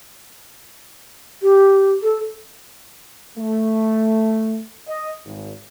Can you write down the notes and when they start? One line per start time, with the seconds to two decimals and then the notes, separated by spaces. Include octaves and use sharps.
1.42 G4
2.03 A4
3.37 A3
4.88 D#5
5.25 G#1